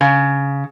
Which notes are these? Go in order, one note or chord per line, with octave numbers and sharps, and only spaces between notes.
C#3